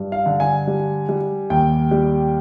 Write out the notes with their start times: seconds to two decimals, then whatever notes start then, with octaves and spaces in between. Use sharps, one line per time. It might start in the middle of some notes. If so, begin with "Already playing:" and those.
Already playing: G2
0.12 F5
0.26 D3
0.40 G#5
0.67 G3
1.09 G3
1.50 D#2 G5
1.91 G3